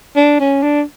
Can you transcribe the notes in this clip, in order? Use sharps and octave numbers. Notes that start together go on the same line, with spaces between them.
D4
C#4
D4